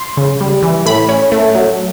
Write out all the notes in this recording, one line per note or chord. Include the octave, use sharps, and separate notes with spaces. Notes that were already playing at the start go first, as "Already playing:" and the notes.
Already playing: C6
C#3
G3
E3
A2 B5
C#4
A3
F#3